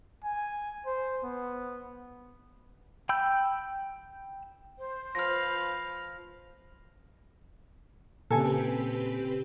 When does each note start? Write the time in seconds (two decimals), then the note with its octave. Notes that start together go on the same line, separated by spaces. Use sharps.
0.24 G#5
0.86 C5
1.24 B3
3.09 G5 B5 E6 G6
4.78 C5
5.15 F3 B4 F5 F6 A#6
8.31 A#2 C#3 C4 G4 A4 B4 G#5 A5